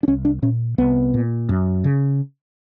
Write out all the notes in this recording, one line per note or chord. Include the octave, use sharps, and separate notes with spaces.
D4
C2 C#4
D4
A#2 C#4
C2 B3
A#2
F#2
C#3